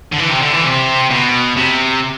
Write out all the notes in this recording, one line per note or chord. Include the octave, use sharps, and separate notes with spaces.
D3
E3
C3
D3
E3
C3
B2
C3